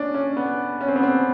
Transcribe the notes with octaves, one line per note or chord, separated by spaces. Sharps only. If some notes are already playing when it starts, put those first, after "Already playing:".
Already playing: C#4 D4
C#4
B3
C#4
C4
B3
C4